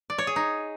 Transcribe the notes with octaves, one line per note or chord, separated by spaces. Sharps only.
D5
C#5
G#4
D#4